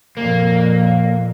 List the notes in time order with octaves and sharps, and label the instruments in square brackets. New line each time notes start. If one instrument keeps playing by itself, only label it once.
[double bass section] F2 A#2 [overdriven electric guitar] A#3